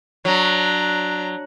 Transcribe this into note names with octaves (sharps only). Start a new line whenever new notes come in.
F#3 D4 A#5